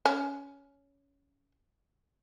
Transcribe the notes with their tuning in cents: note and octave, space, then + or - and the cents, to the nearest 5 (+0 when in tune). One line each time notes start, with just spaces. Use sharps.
C#4 +15